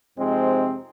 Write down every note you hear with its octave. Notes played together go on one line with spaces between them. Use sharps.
F2 C3 G#3 C4 D#4 C5